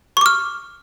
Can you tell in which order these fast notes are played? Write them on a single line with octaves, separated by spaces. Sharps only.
C#6 D6 F6